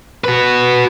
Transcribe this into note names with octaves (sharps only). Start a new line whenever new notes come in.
F#4 B4